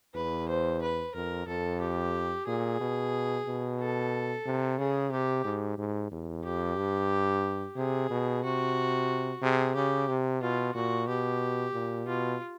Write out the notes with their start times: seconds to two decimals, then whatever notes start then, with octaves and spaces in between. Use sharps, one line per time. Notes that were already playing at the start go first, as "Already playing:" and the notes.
0.15 E2 B4
0.49 C5
0.82 B4
1.15 F2 A#4
1.47 F2 A4
1.81 G4
2.47 A#2 G#4
2.81 B2
3.46 B2
3.80 A4
4.46 C3
4.78 C#3 G#4
5.11 C3 G4
5.45 G#2
5.78 G#2
6.11 E2
6.44 F2 G4
6.77 G2
7.76 C3 G#4
8.10 B2
8.43 C3 F#4
9.42 C3 G#4
9.75 C#3 G4
10.08 C3
10.41 B2 F4
10.75 A#2 F#4
11.07 B2 G4
11.73 A#2
12.06 B2 F4